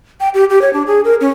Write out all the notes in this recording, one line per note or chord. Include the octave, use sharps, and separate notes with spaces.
G5
G4
G4
C#5
D4
G#4
A#4
C#4